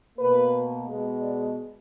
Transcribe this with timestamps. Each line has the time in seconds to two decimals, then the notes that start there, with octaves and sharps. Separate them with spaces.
0.17 B2 A#3 B4
0.87 B2 G#3 B3
1.21 D5